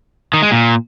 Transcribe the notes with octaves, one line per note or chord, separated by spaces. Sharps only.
D#3
G#3
A#2